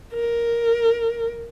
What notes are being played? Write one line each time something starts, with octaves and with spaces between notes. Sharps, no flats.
A#4